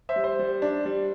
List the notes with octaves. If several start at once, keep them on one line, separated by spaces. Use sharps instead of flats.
C5 E5
G3
C5
G3
D4
G3